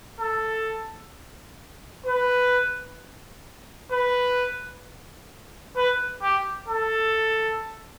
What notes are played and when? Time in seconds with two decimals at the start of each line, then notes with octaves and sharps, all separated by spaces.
0.20 A4
2.06 B4
3.91 B4
5.76 B4
6.23 G4
6.69 A4